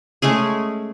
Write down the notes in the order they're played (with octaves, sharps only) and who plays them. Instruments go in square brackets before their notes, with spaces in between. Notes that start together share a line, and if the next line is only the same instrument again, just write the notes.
[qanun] G#3 A3 C#4 G#4